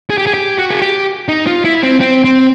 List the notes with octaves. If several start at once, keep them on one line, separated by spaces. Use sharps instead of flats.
G#4
G4
G#4
G4
F#4
G#4
G4
D#4
F4
E4
C4
C4
C4